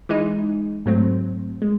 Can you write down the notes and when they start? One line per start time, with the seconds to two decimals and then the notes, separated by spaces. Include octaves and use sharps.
0.09 E3 G#3 D#4
0.86 G#2 F#3 A3 C4
1.62 G#3